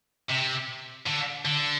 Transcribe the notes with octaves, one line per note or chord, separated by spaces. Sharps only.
C3
D3
D3